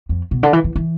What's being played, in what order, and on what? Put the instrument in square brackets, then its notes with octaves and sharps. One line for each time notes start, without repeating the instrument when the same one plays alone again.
[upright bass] F2
B2
D3
E3
E3
E3